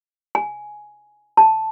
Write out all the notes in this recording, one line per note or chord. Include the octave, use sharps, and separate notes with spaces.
G#5
A5